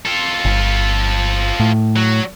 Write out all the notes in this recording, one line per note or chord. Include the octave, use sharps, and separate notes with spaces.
F4 A4
G1
A2
F#3